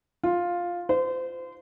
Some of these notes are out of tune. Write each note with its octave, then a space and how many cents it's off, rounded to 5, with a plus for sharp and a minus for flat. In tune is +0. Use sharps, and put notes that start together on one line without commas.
F4 +5
C5 -30